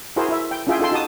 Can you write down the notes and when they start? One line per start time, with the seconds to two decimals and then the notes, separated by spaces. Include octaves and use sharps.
0.16 E4 F#4 G#4 A#4 C5
0.29 E4 E5
0.51 G5
0.67 C#4 E4 F4 G#4 E5 G5
0.80 D#4 F4 A4 G5 C6
0.91 D#4 F#4 A5 D#6